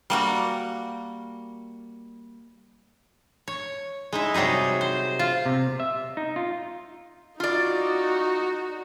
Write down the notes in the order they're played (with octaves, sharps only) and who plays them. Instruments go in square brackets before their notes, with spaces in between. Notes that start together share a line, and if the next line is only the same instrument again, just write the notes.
[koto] G3 A#3 F#4
C#5
G#3 D#4 E4
C3 F#3 G3 D#4 G#4
C5
F4
[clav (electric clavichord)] C3
E5
D#4
F4
[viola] D#4 F#4 [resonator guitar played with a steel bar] F4 D5